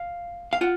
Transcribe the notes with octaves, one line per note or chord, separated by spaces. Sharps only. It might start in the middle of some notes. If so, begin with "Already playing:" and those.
Already playing: F5
F5
F4 F#5